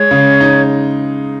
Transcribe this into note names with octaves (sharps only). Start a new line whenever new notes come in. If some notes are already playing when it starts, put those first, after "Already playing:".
Already playing: G#3 C#5
C#3
D#4